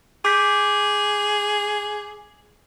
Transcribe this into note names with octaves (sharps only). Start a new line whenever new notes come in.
G#4 D6 G6 B6